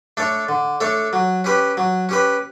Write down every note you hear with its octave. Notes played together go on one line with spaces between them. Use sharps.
A3 D4 A4 C#5
D3
A3 D4 A4 C#5
F#3
C#4 G4 B4
F#3
C#4 G4 B4